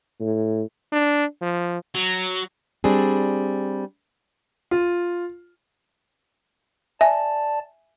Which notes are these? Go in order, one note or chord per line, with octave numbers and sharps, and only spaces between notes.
A2
D4
F3
F#3
G3 C4 D4 G#4
F4
D5 E5 G#5 A5